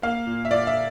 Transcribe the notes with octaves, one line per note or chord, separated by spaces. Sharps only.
A#3 F5
A#2
E5
A#2 D5
E5